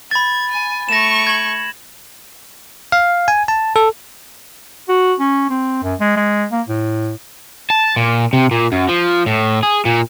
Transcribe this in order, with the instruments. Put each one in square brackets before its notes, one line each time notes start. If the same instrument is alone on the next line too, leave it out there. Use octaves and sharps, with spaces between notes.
[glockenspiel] B5 A6 [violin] G#6
[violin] G#5
[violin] A3 C#6 [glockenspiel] A#6 E7
[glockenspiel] G#6 F#7
[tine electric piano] F5
G#5
A5
A4
[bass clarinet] F#4
C#4
C4
F#2
G#3
G#3
A#3
A2
[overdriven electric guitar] A5
A#2
C3
A#2
F#2
F3
A2
G#4
A#2